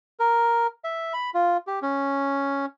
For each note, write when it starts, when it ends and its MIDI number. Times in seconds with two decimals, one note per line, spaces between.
0.20 0.67 70
0.84 1.13 76
1.14 1.30 83
1.34 1.57 65
1.67 1.79 67
1.82 2.66 61